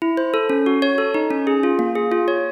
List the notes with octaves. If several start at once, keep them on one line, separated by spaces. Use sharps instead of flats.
E4
C5
A4
C#4
F#4
C#5
A4
D#4
C#4
G#4
F4
A#3
G#4
F4
C#5